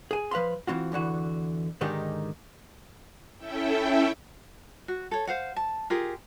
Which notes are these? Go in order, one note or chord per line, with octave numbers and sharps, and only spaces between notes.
G#4 G#5
F3 B4 F5 B5 C6
E3 C4 F4 F#4
E2 D3 E3 F#4
G#2 D3 D#3 G#3 D#4 G4
C#4 E4 A4 E5 G5
F#4
A4 C#5
C5 F5 F#5
A5
F4 G4 G#4 A#4